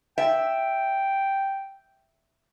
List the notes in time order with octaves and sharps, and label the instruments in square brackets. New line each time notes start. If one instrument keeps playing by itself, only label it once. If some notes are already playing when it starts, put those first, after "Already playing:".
[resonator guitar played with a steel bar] E5 [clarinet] G5